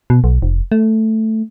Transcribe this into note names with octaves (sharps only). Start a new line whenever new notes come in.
B2
B1
F1
A3